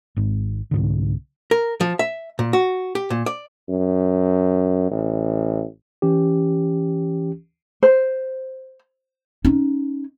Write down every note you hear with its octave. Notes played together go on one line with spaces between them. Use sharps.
G#1 G#2
C2 G#2 D3
A#4
F3
E5
A#2
F#4
G4
A#2
D5
F#2
A1
E3 C#4 G4
C5
C#4 D#4